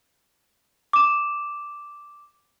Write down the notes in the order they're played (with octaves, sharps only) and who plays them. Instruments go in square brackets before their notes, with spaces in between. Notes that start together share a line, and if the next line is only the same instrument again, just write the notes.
[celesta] D6 E7